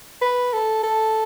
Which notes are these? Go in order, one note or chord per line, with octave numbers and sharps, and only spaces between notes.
B4
A4
A4